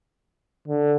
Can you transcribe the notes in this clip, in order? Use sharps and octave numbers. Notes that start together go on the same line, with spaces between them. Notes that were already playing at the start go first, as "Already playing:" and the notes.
D3